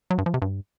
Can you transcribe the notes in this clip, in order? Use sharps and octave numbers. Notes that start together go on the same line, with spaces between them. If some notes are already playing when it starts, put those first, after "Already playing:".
F#3
G2
F3
C3
G2